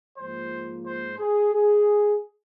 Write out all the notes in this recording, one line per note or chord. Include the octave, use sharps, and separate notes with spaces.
G#2 F3 A#3 F4 C5
C5
G#4
G#4